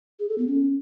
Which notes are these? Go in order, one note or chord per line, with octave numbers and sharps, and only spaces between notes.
G#4
A4
B3
C#4